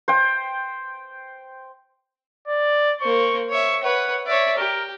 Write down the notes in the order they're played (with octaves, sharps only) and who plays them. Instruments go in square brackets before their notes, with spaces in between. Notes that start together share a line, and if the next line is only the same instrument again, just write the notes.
[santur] C5 G5
[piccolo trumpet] D5
[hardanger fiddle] A#3 C5 [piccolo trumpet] C#6
[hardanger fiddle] C#5 E5 [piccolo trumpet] C#6
[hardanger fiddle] B4 C#5 [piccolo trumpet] F#5
[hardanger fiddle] C#5 D5 [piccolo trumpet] E5
[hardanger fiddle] G4 [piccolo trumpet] A#4